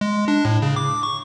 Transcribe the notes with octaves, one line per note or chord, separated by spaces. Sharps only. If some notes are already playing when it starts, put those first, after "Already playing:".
G#3
D4
A2
C#3
D6
C#6